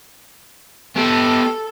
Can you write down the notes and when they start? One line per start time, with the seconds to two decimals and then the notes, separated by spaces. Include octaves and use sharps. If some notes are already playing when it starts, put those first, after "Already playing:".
0.96 B3 G4 A4